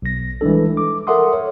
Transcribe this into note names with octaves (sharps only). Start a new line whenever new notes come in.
B1 A#6
E3 G3 G#3 D4 A4
D6
A4 A#4 E5 F#5 C6 D#6
C#5